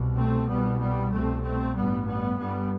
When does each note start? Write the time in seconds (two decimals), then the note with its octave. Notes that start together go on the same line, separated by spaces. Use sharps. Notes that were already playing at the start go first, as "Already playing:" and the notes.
Already playing: C2 B2
0.16 A3 C4
0.48 C2 B2 G3 B3
0.79 G3 B3
1.12 C2 B2 A3 C4
1.43 A3 C4
1.75 A1 G2 G3 B3
2.07 G3 B3
2.38 G1 G2 G3 B3